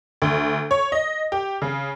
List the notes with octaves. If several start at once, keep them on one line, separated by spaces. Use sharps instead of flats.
D2
C#5
D#5
G4
C#3